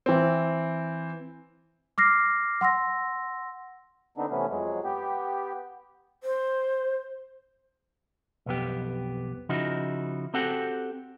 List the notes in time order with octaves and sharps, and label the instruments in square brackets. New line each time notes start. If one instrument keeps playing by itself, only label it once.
[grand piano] E3 C4
[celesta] D6 F6 A#6 C7
F#5 C6 E6 A#6
[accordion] D3 B3 C4 D4 D#4
C3 E3 A3 B3 C#4
F2 F#3 G#3
B3 G4
[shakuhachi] C5
[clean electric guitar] B1 F2 B3 G4
C#3 F3 D#4 E4 F#4
C4 F#4 G4 A4 F#5